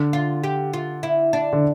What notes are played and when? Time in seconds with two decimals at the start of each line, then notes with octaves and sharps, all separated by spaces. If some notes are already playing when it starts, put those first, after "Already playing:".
Already playing: D3
0.13 F4
0.44 G4
0.73 F4
1.03 E4
1.33 D4
1.53 D3